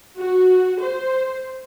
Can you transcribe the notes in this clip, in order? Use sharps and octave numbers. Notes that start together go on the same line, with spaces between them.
F#4
C5